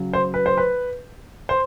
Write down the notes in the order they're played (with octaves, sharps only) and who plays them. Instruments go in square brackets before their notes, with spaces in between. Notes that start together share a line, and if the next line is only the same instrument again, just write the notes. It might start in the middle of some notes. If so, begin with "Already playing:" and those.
Already playing: [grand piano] C#3 F#3
C5
B4
C5
B4
C5